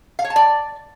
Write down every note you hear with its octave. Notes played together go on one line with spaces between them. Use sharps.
F5
C#5
A5
D5